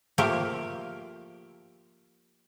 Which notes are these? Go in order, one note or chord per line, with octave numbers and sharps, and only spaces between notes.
F3 A3 A#3 G4 A#4